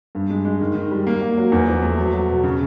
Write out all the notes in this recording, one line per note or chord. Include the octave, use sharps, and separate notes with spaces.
G2
G#3
G#3
D#3
D#3
G3
A#3
A#3
F#3
E2
F3
A3
F#3
F#3
B2
C#3